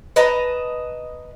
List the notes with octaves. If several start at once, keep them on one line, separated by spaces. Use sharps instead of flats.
B4 D#5 A5 A#5